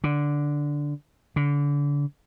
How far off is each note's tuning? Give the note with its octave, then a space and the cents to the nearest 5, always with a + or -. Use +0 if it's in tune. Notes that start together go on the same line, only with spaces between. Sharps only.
D3 -5
D3 -30